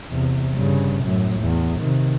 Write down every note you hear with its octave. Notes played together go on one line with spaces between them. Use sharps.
E2 C3
G2 C#3
F#2 A2
E2
C3 D#3